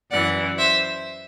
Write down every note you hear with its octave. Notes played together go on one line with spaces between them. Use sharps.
F#2 E3 D5 F#5
C5 E5